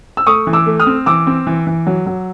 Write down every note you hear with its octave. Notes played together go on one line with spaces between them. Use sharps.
E6
A3 C#6 D#6
E3
D6 E6
A3
D#6 F6
C4
E3 D6 E6
C4
E3
E3
F#3
F#3